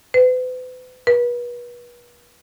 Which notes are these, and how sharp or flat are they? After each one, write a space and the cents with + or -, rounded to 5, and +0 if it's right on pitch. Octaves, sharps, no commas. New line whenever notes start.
B4 +40
B4 -35